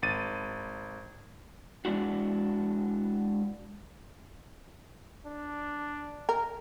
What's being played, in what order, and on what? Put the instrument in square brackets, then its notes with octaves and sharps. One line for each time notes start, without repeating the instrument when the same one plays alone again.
[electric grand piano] G#1 A6 D#7
[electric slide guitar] G#3 D4 E4 F#4
[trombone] D4
[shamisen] A#4